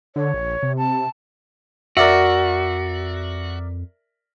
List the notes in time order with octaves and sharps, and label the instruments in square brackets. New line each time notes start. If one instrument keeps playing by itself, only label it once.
[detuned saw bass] D3 [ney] C#5
[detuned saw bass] A#1
C3
[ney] A5
[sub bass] F2 [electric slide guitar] F#4 [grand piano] A#4 D5 E5